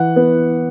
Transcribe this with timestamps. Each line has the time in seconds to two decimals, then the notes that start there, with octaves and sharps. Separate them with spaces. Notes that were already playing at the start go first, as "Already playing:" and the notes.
Already playing: E3 F#5
0.16 B3